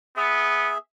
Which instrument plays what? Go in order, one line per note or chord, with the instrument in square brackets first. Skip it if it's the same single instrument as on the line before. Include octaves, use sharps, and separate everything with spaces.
[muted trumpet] B3 [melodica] G#4 E5